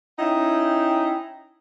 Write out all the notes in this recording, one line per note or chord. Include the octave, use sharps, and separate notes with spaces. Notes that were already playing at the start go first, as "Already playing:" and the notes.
C#4 D#4 E4 G5